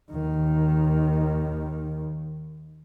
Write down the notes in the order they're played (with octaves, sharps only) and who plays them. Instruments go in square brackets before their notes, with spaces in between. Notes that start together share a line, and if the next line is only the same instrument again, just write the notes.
[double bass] D#2 D#3